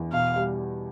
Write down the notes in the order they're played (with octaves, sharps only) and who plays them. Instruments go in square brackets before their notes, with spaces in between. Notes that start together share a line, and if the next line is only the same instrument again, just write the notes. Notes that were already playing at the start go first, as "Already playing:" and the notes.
Already playing: [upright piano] E2
[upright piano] B2 [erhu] F5
[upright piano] G3